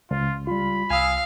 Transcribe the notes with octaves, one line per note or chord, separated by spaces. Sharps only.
C#2 F4
G3 F4 B5
C2 F5 G#5 D#6 E6